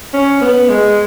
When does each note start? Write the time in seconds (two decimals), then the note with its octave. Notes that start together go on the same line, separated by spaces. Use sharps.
0.14 C#4
0.41 B3
0.69 G#3